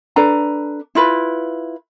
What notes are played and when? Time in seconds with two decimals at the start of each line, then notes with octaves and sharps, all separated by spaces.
0.16 D4 A4 B4 A#5
0.95 E4 F4 B4